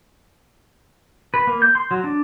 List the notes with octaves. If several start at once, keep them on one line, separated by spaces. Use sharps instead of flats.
B4
A#3
G6
C6
F#3
D4